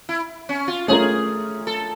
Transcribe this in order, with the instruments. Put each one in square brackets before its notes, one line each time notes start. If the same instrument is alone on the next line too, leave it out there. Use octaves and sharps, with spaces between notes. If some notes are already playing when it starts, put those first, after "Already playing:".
[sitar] E4
C#4
F4
[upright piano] A3 C#4 F4 A#4 [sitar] G#4
[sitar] A4